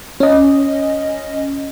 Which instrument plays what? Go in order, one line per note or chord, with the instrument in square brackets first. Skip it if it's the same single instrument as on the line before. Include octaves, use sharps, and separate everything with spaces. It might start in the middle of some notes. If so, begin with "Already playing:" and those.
[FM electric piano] C#4 D#5